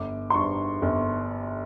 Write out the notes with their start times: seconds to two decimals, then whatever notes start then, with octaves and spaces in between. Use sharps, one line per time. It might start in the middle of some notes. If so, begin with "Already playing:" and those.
Already playing: G1 D6
0.30 C6
0.34 G2 C#6
0.82 G1